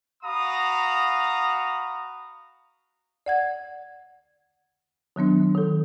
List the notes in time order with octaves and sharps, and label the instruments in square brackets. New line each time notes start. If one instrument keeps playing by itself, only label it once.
[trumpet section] F#4 F5 A#5 B5 D#6
[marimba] D5 F#5 G#6
D#3 F#3 B3 D4
D#3 A4